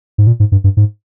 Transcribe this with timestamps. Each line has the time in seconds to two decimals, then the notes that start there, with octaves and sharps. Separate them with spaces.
0.18 G#2
0.27 A#2
0.40 G#2
0.52 G2
0.64 G2
0.77 G#2